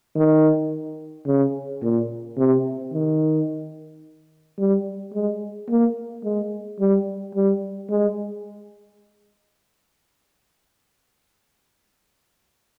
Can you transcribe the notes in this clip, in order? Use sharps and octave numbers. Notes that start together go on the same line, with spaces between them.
D#3
C#3
A#2
C3
D#3
G3
G#3
A#3
G#3
G3
G3
G#3